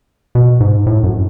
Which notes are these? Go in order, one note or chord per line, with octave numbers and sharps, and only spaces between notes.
B2
G#2
A2
F#2